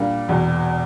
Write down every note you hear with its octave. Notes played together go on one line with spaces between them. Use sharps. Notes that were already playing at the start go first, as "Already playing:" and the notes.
Already playing: A#2 G3 A#3 D4
E1 E2 B2